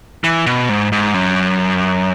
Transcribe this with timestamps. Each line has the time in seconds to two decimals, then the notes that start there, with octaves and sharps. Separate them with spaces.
0.24 E3
0.46 B2
0.69 G#2
0.92 G#2
1.14 F#2